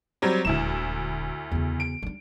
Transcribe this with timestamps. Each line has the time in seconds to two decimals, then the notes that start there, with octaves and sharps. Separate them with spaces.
0.22 F#3 G3 C4
0.45 D#1 D2 G#3 E4 E7
1.52 E2 C#3
1.80 D7
2.03 G3 D4